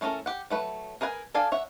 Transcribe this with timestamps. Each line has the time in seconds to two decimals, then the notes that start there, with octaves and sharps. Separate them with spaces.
0.01 E3 A3 C#4 A4 A#4
0.26 G4 F#5
0.50 F#3 A3 B4
1.01 G#4 A#4 B4 F#5 G#5
1.34 D4 A4 D5 F5 G#5
1.52 C#5 E5 F#5